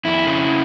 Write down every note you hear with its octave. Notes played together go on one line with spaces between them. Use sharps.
F2 E4
C#3